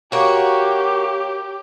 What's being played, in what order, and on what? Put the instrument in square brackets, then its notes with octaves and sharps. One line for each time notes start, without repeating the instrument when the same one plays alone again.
[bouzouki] A#3 F#4 [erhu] G4 [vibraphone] C#5